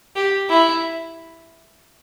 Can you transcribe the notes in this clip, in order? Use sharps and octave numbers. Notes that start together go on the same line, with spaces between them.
G4
E4